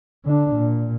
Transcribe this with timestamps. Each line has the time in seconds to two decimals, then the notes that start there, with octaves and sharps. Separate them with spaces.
0.25 D3 D4
0.55 A#2